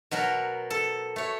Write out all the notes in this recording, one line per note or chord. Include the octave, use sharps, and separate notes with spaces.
B2 F#3 F#4 A#4
A4
A3 C#5